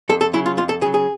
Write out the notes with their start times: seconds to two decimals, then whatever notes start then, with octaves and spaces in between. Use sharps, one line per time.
0.09 F2 A4
0.21 A4
0.33 C#3 F#3 E4
0.46 F4
0.57 F2 F4
0.69 A4
0.81 C#3 G#4
0.86 F#3
0.94 G#4